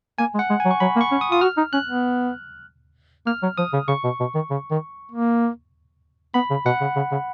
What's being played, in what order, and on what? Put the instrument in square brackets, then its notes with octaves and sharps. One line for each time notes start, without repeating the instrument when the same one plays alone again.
[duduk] A#3 [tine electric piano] G#5
[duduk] G#3
[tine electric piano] F#5
[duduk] G#3
[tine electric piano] G#5
[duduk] F#3
[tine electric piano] C#6
[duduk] F#3 [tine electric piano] B5
[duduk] A#3
[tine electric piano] C#6
[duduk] C#4
[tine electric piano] D#6
[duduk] F4 [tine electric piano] D#6
[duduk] F#4 [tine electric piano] F6
[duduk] D#4
[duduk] C#4 [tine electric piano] F#6
[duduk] B3
[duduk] A#3 [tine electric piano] F6
[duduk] F#3
[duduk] F3 [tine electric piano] D#6
[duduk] C#3
[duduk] C#3 [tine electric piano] C#6
[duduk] B2
B2
D#3
C#3
D#3
A#3
[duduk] B3 [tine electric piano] B5
[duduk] C#3
[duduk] B2 [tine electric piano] F#5
[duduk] C#3
C#3
C#3